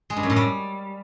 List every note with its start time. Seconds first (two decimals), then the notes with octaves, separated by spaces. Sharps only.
0.10 G#3
0.16 G2
0.23 F#2
0.30 A2
0.36 G3